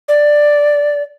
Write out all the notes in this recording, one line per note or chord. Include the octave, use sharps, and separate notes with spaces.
D5